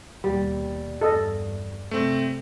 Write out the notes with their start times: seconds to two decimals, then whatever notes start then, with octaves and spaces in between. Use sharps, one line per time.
0.24 D#2 B2 G3
1.01 E2 G2 A4 D#5
1.91 C3 A3 C4